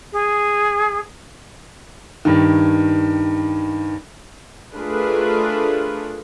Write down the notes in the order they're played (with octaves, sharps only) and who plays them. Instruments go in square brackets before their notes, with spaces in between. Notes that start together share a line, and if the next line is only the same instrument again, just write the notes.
[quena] G#4
[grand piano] G2 D#3
[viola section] A3 D4 F4 G#4 A#4 B4